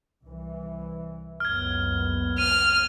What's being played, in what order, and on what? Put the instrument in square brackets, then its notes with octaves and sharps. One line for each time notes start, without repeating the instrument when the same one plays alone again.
[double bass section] C2 E3
[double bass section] F#1 C#2 B3 [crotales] F6 G#6
[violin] F6 [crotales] D#7